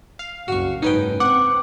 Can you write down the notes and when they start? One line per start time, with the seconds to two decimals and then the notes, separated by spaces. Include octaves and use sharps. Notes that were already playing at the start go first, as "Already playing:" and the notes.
0.19 F5
0.48 F#1 C2 F#4 C#6
0.82 F#1 G#2 C#4 D#4 B4 G5
1.20 C4 F#5 D6